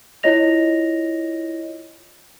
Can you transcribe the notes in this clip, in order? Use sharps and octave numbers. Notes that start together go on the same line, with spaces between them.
E4 F4 C#5 D#5 A#6 F7